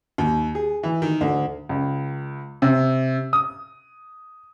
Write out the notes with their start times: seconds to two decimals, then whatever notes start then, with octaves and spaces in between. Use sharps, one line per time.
0.18 D#2
0.55 G#4
0.83 E3
1.02 D#3
1.21 D2
1.69 C#2
2.62 C3
3.33 D#6